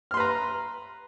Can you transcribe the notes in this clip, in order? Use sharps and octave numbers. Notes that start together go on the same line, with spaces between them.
B4 A#5 C6 F6